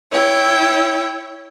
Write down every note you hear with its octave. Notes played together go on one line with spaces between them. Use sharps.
E4 C#5 G5